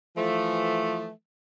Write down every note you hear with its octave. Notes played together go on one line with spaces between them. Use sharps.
E3 F3 A3